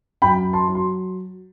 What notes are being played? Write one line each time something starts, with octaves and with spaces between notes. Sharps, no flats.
F#2 G5 B5
A5 C6
F#3
C6